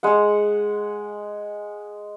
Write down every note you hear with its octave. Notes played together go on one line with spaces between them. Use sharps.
G#3 F#5